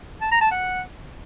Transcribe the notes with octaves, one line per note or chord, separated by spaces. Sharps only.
A5
A#5
A5
F#5